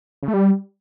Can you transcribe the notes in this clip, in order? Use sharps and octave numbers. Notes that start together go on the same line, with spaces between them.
C#3
A3
G3